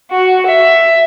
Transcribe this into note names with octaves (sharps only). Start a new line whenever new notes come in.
F#4
E5